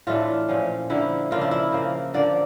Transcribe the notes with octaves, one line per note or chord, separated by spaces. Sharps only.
A2 E3 A3 D4 F4
A#2 F3 C#4
D3 F3 A#3 E4
C#3 F3 A#3 D4 F4
E4
E4
C#3 F3 A#3
D3 F3 A#3 D4 D5